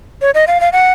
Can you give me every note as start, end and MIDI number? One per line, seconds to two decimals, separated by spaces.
0.22 0.31 73
0.34 0.45 75
0.47 0.61 77
0.61 0.69 77
0.73 0.93 78